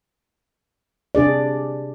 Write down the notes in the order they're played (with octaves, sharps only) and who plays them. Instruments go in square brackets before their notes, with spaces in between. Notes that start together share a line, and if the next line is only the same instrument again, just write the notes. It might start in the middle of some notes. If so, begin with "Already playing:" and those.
[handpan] C3 D4 G#4 D5